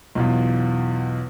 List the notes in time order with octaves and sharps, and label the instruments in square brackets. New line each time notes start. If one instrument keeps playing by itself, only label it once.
[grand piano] B1 E2 F4